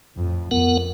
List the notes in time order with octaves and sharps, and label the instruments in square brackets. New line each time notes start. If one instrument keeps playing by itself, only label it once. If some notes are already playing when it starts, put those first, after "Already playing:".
[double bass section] F2 A2
[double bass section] F2 [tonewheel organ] B3 A#4 F#5